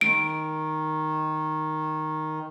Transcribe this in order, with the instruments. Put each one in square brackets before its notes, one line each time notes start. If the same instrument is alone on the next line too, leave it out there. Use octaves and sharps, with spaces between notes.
[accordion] D#3 [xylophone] D7